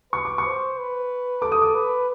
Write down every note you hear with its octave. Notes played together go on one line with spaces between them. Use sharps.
B4 C#6
D6
C#6
C5
B4
A4 D6
D#6
D6
B4